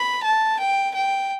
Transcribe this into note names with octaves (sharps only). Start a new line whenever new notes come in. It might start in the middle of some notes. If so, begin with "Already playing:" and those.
Already playing: B5
A5
G5
G5